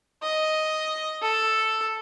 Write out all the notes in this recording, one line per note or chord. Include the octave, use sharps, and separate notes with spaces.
D#5
A4